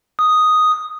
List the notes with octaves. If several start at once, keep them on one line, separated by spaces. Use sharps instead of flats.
D#6